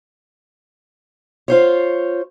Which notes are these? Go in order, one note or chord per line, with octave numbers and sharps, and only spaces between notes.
F4 C5 C#5